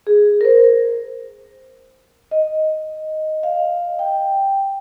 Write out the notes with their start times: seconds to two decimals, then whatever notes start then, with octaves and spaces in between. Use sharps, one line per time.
0.07 G#4
0.41 A#4
0.45 C5
2.31 D#5
3.43 F5
3.99 G5